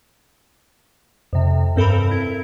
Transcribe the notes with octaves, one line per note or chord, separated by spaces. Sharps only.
F2 C3
G2 C4 A4 A#4 B5
E4